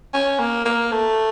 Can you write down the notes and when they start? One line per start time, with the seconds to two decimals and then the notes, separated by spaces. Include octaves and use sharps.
0.14 C#4
0.39 A#3
0.65 A#3
0.92 A3